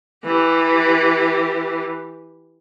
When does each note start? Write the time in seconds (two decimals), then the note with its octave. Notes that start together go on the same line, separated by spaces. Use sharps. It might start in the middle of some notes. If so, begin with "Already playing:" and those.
0.24 E3 G4